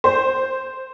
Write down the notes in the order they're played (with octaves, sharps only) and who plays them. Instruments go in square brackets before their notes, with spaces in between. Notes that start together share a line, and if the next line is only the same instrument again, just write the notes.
[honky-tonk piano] C5